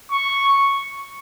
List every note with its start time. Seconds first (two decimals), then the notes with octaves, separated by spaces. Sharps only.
0.12 C#6